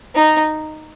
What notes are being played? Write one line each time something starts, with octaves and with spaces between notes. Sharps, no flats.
D#4